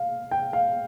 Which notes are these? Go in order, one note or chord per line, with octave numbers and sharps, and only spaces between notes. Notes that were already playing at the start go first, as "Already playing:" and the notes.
Already playing: F5
G5
F5